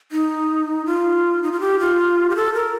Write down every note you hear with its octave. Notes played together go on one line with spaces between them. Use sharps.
D#4
F4
D#4
F4
G4
F4
G4
A4
A#4